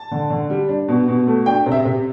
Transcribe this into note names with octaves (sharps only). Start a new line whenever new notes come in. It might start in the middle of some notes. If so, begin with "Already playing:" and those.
Already playing: A5
D3
D3
G3
D4
B2
B2
A3
D4 G5
C3
E5
C3